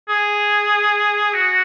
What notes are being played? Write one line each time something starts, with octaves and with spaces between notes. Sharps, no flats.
G#4
F#4